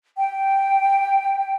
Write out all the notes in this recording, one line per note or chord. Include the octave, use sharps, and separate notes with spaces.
G5